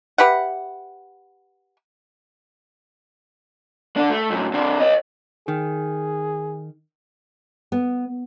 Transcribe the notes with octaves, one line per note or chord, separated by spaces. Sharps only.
G4 B4 E5 F#5
D3 D4
A3
F#2 A2
C3 D4
C#5 D#5
D#3 G#4
B3